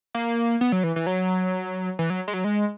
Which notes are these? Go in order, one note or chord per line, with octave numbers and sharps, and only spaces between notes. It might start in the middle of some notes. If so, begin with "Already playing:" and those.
A#3
B3
F#3
E3
E3
F#3
E3
F#3
G#3
F#3
G#3